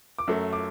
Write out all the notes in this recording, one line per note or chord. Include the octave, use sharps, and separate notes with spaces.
D6
F#2 F#3 A3 E6
D6